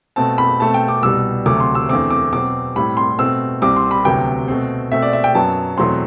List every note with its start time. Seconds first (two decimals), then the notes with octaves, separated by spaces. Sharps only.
0.16 B2 A3 C4 A5
0.38 B5
0.60 B2 A3 C4 A5
0.74 G5
0.88 D6
1.03 C2 B2 G3 E6
1.46 D2 C3 F#3 A3 D6
1.60 C6
1.75 E6
1.89 E2 D3 A3 C4 D6
2.10 D6
2.32 B2 F#3 C4 D6
2.75 A2 G3 C4 B5
2.97 C6
3.19 B2 A3 C4 E6
3.61 C2 C3 G3 C4 D6
3.77 C6
3.91 B5
4.05 D2 C3 F#3 B3 G5
4.48 B2 A3 C4
4.92 B2 A3 C4 E5
5.02 D5
5.13 E5
5.24 G5
5.34 F#2 F#3 B3 A5
5.77 E2 B2 F#3 A3 C4 C6